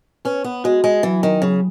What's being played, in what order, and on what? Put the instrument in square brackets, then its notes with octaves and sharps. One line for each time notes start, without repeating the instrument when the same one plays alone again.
[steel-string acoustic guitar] C#4 [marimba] B4
[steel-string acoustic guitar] B3
[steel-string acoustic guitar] G#3 [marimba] F#4
[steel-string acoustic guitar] G#3
[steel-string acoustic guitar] E3 [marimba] F#3
[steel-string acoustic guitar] D#3
[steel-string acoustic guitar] C#3 [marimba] F#3